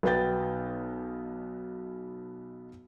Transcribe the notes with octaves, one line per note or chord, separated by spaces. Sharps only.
B1 B2 B3 G5 G6 A6